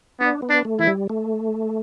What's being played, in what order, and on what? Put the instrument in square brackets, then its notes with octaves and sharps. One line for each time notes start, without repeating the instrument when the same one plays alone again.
[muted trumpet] B3 [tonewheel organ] D4
[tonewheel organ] B3
[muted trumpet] D4
[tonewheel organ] A3
[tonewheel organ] E3 [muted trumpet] E4
[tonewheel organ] G3
A3